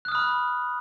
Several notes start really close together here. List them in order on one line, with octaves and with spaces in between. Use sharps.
F#6 D#6 F6 B5